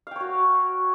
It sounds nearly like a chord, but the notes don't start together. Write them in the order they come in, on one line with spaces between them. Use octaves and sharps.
F5 G5 C#5 F#4